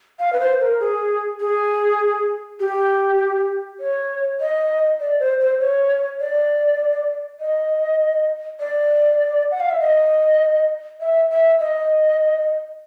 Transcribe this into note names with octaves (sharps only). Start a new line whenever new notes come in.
F5
B4
C5
A#4
G#4
G#4
G4
C#5
D#5
D5
C5
C5
C#5
D5
D#5
D5
F#5
F5
E5
D#5
E5
E5
D#5